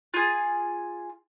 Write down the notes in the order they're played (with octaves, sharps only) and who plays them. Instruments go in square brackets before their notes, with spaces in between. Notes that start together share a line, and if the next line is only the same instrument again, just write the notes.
[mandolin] F4 G#4